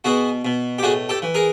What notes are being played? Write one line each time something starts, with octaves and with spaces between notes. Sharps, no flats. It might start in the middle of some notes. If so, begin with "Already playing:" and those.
B2 F#4 G#4
B2
G4
A2 F#4 G#4
G4 A4
E3
G#4 A#4